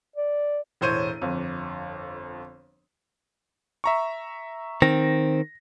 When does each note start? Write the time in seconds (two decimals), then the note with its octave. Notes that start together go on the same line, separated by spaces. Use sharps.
0.16 D5
0.81 E1 A2 C5 C#5 D#7
1.21 G1 F2
3.84 E5 A#5 C#6
4.82 D#3 C4 A#6